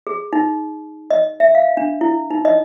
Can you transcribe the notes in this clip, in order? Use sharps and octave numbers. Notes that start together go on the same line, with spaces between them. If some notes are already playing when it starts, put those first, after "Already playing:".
G#4
D#4
D#5
E5
F5
D4
E4
D#4
D#5